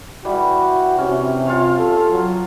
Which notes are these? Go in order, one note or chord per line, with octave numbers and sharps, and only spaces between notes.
E3 G3 F#4 G4
C3 C#4
F4 C#5 F5
A4
F#3